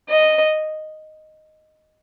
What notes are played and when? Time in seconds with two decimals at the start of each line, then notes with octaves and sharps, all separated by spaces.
0.09 D#5